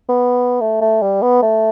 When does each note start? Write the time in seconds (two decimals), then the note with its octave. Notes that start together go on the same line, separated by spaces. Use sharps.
0.09 B3
0.61 A3
0.81 A3
1.02 G3
1.22 B3
1.42 A3